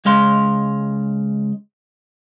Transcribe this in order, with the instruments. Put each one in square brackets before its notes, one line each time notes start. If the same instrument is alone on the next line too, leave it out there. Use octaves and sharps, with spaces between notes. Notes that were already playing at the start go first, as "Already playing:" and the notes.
[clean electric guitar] C#2 G#3 F5 C6